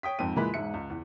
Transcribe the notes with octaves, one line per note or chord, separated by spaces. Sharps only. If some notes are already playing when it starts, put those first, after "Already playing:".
C#5 G5 D#6 B6
F2 G#2 C4 D#7
A#2 E3 G#3 B5 F#6 B6
E1 G#2 E5 C#7
C#2
E2